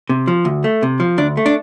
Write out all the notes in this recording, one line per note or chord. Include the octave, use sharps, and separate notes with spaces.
C3
F3
D2
A3
C3
F3
D2 D4
A3
D4